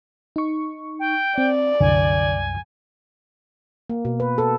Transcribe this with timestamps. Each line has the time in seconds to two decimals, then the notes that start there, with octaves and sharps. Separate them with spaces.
0.36 D#4 C#6
1.00 G5
1.38 C4 D5
1.81 C2 F#2 D3 G#5
3.90 A#3
4.05 B2
4.20 B4
4.38 A4